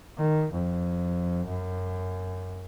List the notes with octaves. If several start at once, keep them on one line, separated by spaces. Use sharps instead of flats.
D#3
F2
F#2